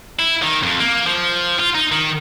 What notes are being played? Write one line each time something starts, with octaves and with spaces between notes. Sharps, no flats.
E4
D#3
F2
A#3
F3
F4
D#4
D#3